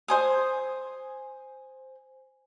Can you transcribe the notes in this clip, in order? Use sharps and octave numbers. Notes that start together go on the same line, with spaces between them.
C5 G#5 D#6